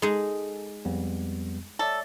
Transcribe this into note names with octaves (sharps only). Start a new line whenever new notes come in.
G#3 D#4 G#4 A4
F2 G3 B3
A4 C#5 D5 E5